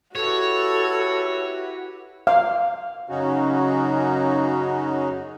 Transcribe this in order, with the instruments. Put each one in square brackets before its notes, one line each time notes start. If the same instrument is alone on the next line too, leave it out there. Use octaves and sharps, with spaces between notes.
[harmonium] E4 G4 B4 [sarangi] F#4 [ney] A4 [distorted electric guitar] C#5
[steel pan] F5
[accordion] F#2 C#3 C#4 D#4 F#4